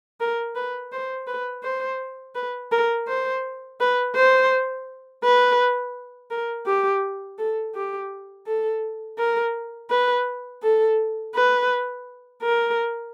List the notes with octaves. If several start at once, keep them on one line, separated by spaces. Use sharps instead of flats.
A#4
B4
C5
B4
C5
B4
A#4
C5
B4
C5
B4
A#4
G4
A4
G4
A4
A#4
B4
A4
B4
A#4